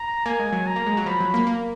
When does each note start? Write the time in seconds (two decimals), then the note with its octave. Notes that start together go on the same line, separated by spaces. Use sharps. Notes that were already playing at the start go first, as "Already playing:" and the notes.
Already playing: A#5
0.26 A#3 G#5
0.40 G#3
0.53 F#3
0.66 A#5
0.76 A#3
0.87 G#3
0.97 F#3
1.06 F3 B5
1.21 F#3
1.34 A#3
1.47 A#3